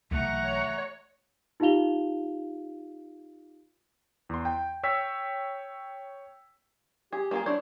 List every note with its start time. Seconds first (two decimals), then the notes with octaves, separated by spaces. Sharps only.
0.11 B1 E3 A3 F#5 A#5 C#6
0.45 C#5
1.60 D#4 F4 G4 F5 F7 G7
4.29 E2 C6
4.45 G5
4.83 C#5 G5 E6 B6
7.13 G4 G#4
7.31 A#3 F4 G#4
7.46 D4 E4 C5 C#5